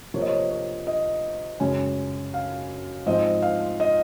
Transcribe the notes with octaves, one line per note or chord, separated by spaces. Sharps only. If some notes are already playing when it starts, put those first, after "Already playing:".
C3 F3 A#3 C#5
D#5
C#5
C#5
D#5
F#2 C#3 G#3 C#4
F5
G#2 F3 C4 D#5
F5
D#5